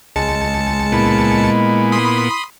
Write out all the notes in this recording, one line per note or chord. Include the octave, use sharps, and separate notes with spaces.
C#2 G#3 A5 C#7
A#2 B3 E4
B5 C6 D#6